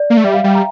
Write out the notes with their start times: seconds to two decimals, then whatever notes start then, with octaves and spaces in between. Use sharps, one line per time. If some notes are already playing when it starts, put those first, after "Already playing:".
Already playing: D5
0.10 A#3
0.17 A3
0.24 G3 E5
0.34 F5
0.44 G3 G5
0.55 A#5